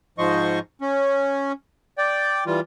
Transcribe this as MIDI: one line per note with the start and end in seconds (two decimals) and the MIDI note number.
0.18 0.59 44
0.18 0.59 53
0.18 0.59 72
0.18 0.59 75
0.18 0.59 85
0.81 1.52 61
1.98 2.44 74
1.98 2.44 79
2.46 2.60 52
2.46 2.60 55
2.46 2.60 65